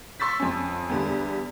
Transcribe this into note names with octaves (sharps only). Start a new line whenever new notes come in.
C6 C#6 E6 A6 B6
F2 C#4
E2 D3 G3